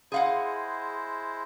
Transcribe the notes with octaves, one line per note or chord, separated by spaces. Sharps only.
G#3 E4 G#4 C5 F5 F#5